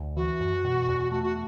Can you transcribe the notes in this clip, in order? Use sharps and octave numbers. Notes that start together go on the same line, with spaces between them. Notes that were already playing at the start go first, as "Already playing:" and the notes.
Already playing: D2
E3 F#4
F#2
B2
E2
A3 F#4
F#4